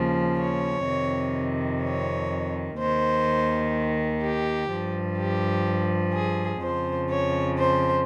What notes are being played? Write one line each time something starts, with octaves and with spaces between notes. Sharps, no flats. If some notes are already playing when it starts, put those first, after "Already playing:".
Already playing: D#2 C#3 F3
C#5
F2 C3 D#3
C#5
D#2 D#3 C5
G4
G2 F3
G4
G#4
F2 C#3 F3 C5
C#5
C5